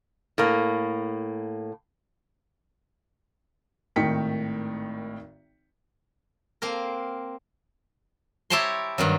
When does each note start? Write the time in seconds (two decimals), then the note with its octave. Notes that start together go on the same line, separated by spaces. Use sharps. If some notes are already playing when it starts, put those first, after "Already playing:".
0.38 A2 A#3
3.96 G#1 A2 D#3 G5 B6 C#7
6.62 A#3 C4 A#4
8.50 E4 G4 C#5 A5 A#5 C6
8.98 G2 D#3 F#3